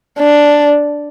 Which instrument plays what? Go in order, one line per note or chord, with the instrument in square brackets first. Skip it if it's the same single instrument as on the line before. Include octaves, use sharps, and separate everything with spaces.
[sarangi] D4